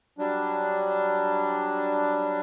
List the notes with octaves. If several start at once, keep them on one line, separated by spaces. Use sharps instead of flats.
F#3 G3 D4